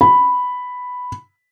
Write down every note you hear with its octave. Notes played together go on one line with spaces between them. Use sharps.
B5